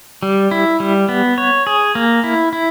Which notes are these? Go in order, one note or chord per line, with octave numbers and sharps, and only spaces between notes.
G3
E4
G3
B3
C#5
G#4
A#3
E4
E4